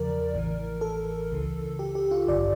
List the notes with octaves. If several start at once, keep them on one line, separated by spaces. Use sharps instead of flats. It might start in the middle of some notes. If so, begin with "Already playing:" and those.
Already playing: E2 C#3 F3 A#4 D5
A1 A2 E3
A4
C#2 C#3 E3
G4
G4
F4
A1 G2 D3 D5